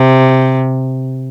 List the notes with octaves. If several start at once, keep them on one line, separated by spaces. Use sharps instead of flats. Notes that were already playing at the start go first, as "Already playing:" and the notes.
Already playing: C3